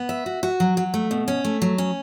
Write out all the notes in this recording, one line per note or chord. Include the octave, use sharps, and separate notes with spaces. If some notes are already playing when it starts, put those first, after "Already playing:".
Already playing: B3
E5
F#4
F#4
F#3
F#3
A3
B2
C#4
A3
F#3
C#4